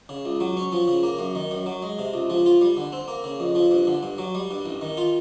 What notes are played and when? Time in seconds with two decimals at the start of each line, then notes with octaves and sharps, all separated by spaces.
0.09 C#3
0.25 C#2
0.40 F#3
0.57 C#4
0.72 F3
0.88 C#3
1.03 A#3
1.19 F#2
1.35 D#3
1.51 F#2
1.66 F#3
1.82 G#3
1.99 C3
2.14 C#2
2.30 F3
2.46 F4
2.61 G3
2.77 D3
2.92 C4
3.08 A#3
3.24 C#3
3.40 F2
3.55 F3
3.71 G2
3.87 D3
4.03 G2
4.18 F#3
4.35 G3
4.51 G2
4.66 A1
4.81 D#3
4.97 F4